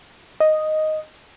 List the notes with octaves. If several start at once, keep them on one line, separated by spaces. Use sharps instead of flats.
D#5